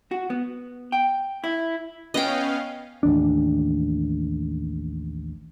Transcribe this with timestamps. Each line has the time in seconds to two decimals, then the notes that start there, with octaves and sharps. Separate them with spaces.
0.11 F#4
0.30 B3
0.92 G5
1.44 E4
2.14 B3 C#4 D#5 F5 G5
3.03 A1 D#2 D4